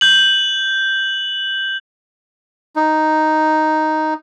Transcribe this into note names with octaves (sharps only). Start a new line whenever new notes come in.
G6 F#7
D#4